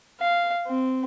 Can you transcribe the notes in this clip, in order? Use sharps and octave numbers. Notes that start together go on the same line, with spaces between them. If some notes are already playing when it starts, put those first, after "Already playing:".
F5
C4